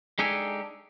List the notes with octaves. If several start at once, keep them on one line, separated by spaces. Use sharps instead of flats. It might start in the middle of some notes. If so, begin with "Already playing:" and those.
G#3 D4 D#4 G4 A4 G#5